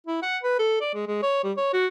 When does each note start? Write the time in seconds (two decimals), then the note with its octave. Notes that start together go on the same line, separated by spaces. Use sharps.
0.07 E4
0.22 F#5
0.43 B4
0.59 A4
0.81 D5
0.94 G#3
1.07 G#3
1.22 C#5
1.44 G3
1.57 C#5
1.73 F#4